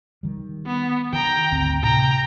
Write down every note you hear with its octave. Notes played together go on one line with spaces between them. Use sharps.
D#3 G3
B3
D#3 G5 A#5
G#1 D2 C4
A2 C3 G5 A#5